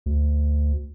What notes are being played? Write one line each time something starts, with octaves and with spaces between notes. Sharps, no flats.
D2